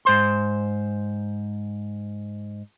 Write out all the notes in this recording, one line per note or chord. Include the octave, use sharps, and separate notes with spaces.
G#2 C5 C6